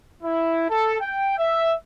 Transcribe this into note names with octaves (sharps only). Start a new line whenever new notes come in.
E4
A4
G5
E5